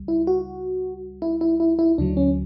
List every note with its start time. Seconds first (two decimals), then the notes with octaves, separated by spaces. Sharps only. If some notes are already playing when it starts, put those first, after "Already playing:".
Already playing: C#2 G3
0.08 E4
0.27 F#4
1.22 E4
1.41 E4
1.60 E4
1.79 E4
1.98 D2 D3 F#3 D4
2.17 C#4